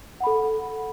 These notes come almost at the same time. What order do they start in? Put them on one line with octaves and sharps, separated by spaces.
F#5 B5 A4